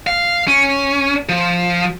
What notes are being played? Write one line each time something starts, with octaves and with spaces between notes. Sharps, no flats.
F5
C#4
F3